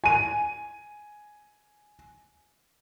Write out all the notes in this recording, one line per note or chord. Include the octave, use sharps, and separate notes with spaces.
G#5 D#7